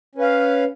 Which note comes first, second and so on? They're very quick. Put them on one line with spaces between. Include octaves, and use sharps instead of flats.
C#4 B4 F5